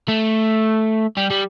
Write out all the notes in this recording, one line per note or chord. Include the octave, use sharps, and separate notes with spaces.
A3
G3
G3